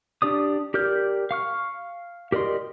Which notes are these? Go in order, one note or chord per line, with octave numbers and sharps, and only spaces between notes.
D4 G4 D5 D#6
G4 A#4 D5 F6 G6
F5 C#6 F6
G4 A#4 D5 D#5 C6